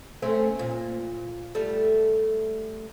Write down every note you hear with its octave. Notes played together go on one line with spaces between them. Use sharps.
A3 C4 C#4
A#2
G3 A3